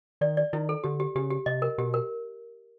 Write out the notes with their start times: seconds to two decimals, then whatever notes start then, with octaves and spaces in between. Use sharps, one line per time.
0.21 D#3 D5
0.37 D5
0.53 D#3 E4
0.69 A4
0.84 D3 G4
1.00 G4
1.16 C#3 G4
1.30 G4
1.46 C3 D#5
1.62 A#4
1.78 B2 G4
1.94 A#4